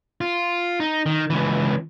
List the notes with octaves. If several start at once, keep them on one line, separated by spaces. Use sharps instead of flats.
F4
D#4
D#3
C#2 E3